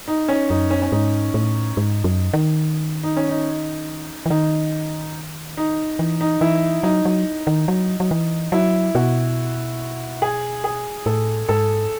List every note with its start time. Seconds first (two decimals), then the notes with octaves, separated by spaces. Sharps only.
0.08 D#4
0.28 C#4
0.49 F#2 D#4
0.71 C#4
0.82 C#4
0.92 G#2 D#4
1.34 A2
1.77 G#2
2.04 F#2
2.33 D#3
3.03 D#4
3.17 C#4
3.29 D#4
4.26 E3
4.30 D#3 D#4
5.57 D#4
5.99 E3
6.21 D#4
6.41 E3 E4
6.83 F#3 D#4
7.05 F#3
7.47 D#3
7.68 F#3
8.00 F#3
8.11 E3
8.52 F#3 E4
8.95 B2 F#4
10.22 G#4
10.64 G#4
11.06 A2 A4
11.49 G#2 A4